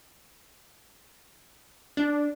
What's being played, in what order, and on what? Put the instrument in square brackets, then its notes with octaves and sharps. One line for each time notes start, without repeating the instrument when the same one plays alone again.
[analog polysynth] D4